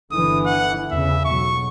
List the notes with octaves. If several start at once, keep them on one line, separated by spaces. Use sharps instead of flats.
G1 D3 E3 D#6
F#5
E2 C#3 E5
B1 F#3 C#6